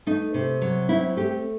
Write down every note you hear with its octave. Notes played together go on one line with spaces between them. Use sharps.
A3 D#4
C3
F#3
C4 E4
A3 G4